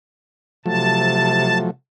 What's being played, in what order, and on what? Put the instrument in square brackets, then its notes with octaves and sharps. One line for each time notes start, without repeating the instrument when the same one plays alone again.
[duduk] C3 [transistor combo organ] F3 F#3 A3 [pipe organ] A5